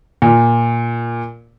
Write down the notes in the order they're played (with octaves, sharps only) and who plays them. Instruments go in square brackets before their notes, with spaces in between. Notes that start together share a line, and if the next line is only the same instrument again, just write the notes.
[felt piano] A#2